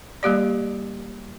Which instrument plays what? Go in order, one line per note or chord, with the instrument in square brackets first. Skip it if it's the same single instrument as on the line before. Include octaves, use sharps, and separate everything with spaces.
[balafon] G3 A#3 G4 D5